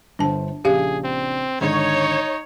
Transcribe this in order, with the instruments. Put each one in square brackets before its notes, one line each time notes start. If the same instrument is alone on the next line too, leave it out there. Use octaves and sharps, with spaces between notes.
[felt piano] G1 D3 C5 [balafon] D4 A5
[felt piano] A#1 C#3 D4 [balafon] G4 F5 [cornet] G#4
[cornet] C4
[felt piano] G#1 D3 [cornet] D#4 [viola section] C#5